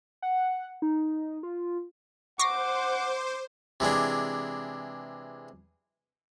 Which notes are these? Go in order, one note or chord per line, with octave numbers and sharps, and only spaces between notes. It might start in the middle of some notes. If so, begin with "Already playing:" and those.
F#5
D#4
F4
C5 F#5 C#6 D6 A#6 C7
C3 E3 G#3 D4